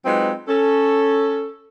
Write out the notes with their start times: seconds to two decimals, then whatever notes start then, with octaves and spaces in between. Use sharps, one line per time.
0.05 F#3 G#3 C4 D#4 F4 B4
0.48 C#4 A4